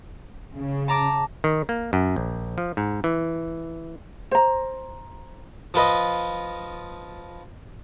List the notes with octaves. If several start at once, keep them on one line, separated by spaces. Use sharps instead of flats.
C#3
A5 A#5 D6
D#3
A#3
F#2
A#1
F3
G#2
E3
C5 A#5
F3 F4 B4 D#5